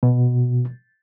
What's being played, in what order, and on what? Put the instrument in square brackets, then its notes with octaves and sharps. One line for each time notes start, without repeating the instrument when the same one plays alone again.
[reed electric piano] B2